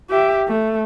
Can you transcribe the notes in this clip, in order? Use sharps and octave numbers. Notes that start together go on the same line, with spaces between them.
G4 E5
A3